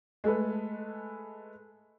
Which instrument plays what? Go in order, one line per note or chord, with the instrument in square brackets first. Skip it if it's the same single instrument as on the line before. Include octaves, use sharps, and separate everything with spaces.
[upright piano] G#3 A3 A4 B4